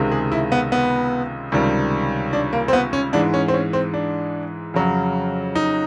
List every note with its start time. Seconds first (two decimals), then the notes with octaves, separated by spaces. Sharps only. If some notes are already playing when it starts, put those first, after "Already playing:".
Already playing: C#2 C3 D#3 G#3
0.12 G#4
0.32 E4
0.52 B3
0.72 B3
1.52 C#2 C3 D#3 G3
2.33 D4
2.53 A#3
2.68 C4
2.73 B3
2.93 C#4
3.13 G#2 E3 G#3 D4
3.34 C#4
3.48 C4
3.54 C#4
3.73 C4
3.94 D4
4.74 F2 C#3 F#3
5.55 D#4